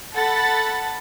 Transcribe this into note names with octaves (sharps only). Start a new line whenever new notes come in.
A4 F#5 A5 B5 A6